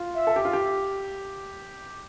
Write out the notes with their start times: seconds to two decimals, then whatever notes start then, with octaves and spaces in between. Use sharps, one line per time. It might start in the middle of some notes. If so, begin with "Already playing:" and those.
Already playing: F4
0.15 E5
0.27 A4
0.36 G4
0.45 F4
0.53 G4